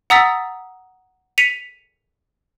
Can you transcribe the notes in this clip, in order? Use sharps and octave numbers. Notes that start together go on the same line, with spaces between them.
F#5 A#5 D#6 E6 A6 B6
B6 C#7 D#7 F7